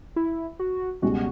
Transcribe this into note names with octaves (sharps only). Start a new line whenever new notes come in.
E4
F#4
C#2 B2 G3 C#4 F#4